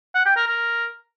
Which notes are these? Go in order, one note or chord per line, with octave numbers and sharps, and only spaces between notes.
F#5
G5
A#4
A#4